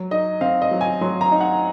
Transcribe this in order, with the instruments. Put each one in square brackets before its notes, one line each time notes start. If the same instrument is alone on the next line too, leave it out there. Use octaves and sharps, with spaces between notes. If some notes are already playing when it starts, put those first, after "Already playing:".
Already playing: [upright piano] F#3
D#4 D#5
C4 F5
D#5
F#3
G#5
F#3 C6
A#5
D#4
F#5